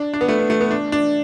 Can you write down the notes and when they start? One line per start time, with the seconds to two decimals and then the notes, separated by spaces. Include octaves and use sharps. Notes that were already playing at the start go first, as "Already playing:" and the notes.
Already playing: D4
0.14 D4
0.21 B3
0.28 A3
0.39 B3
0.50 A3
0.61 B3
0.71 D4
0.92 D4